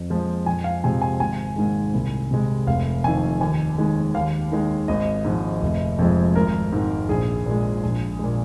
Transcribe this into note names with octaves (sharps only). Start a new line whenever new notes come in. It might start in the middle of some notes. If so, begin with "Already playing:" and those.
Already playing: F2
F3 G#3
F2 G#5
F5
C3 F3 G#3 G#5
G#5
G#1 G#5
G#2 D#3 G#3
C2
C3 G#3
F1 F5
F2 D#3 G#5
D#2 G#5
D#3 G#3
D#2 F5
D#3 G#3
G#1 D#5
G#2 F3
F1
F2 F3 G#3
G#1 A#4
G#2 D#3
A#1 G#4
A#2 G#3
A#1
A#2 G#3